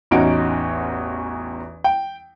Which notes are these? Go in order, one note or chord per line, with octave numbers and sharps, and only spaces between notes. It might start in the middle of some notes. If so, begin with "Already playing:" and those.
A1 E2 C#4 D#4 F#4 D7
G5